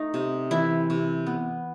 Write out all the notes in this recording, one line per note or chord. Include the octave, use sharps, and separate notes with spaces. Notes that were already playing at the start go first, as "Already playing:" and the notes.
Already playing: A3 D#4
C3
E3 E4
C3
B3